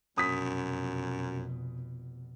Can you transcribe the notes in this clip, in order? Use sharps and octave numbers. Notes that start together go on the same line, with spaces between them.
F1 F#2 B2 D#6 B6